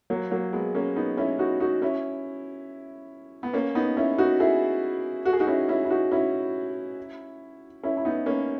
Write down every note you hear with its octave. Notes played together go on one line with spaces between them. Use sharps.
F#3 A#3
F#3 A#3
G#3 B3
A#3 C#4
B3 D#4
C#4 E4
D#4 F#4
D#4 F#4
C#4 E4
B3
A#3 C#4
B3 D#4
C#4 E4
D#4 F#4
E4 G#4
F#4
G#4
D#4 F#4
C#4 E4
C#4 E4
E4
D#4 F#4
C#4 E4
C#4 E4
E4
B3 D#4
A#3 C#4